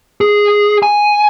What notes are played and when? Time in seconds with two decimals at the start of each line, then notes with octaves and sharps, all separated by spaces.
0.21 G#4
0.83 G#5